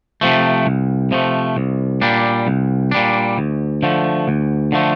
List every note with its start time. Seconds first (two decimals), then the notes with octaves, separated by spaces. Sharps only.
0.21 C3 F3 A3
0.66 C2
1.11 C3 F3 A3
1.57 C2
2.01 A#2 G3 D4
2.47 C2
2.91 A#2 G3 D4
3.38 D2
3.83 D3 F3 A3
4.28 D2
4.72 D3 F3 A3